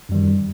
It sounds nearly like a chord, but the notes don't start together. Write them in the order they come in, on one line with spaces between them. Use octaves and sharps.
F#2 G3 D#3